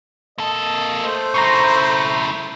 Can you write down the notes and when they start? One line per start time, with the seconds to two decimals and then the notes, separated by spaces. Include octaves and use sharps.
0.38 A#3 A4 D#5
1.04 A3 C5
1.34 C#3 E4 A#5 C6 C#6